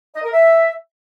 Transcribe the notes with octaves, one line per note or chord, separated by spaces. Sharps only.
D#5
A#4
E5